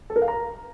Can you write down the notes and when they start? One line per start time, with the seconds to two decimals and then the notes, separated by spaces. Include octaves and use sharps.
0.10 A4
0.16 A#4
0.22 F5
0.28 A#5